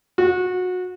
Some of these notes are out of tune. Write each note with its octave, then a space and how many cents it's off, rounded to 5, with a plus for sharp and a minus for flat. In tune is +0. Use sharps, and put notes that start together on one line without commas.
F#4 -25